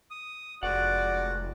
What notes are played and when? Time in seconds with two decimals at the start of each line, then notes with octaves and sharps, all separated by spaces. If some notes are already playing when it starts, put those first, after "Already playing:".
0.11 D#6
0.63 F1 G#3 F#4 D5 F#5